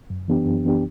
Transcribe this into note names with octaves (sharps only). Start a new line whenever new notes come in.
F#2
E3 B3 D4 G4
F#2
E3 B3 D4 G4